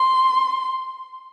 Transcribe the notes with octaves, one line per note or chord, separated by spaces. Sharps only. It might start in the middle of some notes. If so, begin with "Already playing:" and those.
Already playing: C6